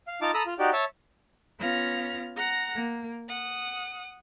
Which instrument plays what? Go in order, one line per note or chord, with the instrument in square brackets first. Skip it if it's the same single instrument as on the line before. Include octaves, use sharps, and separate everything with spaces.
[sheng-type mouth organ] F5
D#4 F4 A5 D6
A4 A#5 B5 D#6 E6
F4
D#4 F#4 G4 D5
C#5 E5 A5
[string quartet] B3 C#4 F4 F5 F6 A#6
F#5 A#5 A#6
A#3
F#5 D#6